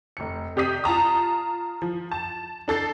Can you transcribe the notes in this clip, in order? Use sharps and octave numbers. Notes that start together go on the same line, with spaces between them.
F1 C#7
C3 G4 D5 D#6 B6 D#7
F4 A5 A#5 D#6
F3
A5
D4 A4 A6 C7